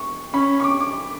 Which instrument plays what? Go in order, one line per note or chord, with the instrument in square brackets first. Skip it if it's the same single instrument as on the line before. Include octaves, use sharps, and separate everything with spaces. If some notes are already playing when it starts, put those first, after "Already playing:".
Already playing: [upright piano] C#6
[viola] C#4 [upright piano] B5
[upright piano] C#6
D6
D6